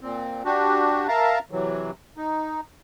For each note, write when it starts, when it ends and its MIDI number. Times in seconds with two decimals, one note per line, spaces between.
0.01 0.43 46
0.01 0.43 60
0.45 1.07 62
0.45 1.07 66
0.45 1.07 67
1.08 1.39 70
1.08 1.39 76
1.08 1.39 77
1.08 1.39 81
1.08 1.39 82
1.51 1.91 48
1.51 1.91 52
1.51 1.91 54
2.17 2.61 63